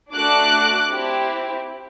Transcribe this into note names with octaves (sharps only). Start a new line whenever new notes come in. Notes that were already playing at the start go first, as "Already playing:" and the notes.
A3 D4 F#4 A4 D6 F#6
C4 E4 G4